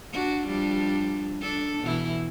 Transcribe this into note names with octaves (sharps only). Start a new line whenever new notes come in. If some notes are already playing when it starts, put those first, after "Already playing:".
D4 F#4
F3 G3 D4
D4 A4
B2 E3 E4